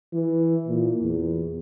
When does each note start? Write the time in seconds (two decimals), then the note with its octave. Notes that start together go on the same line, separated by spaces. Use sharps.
0.13 E3
0.68 A#2
1.02 E2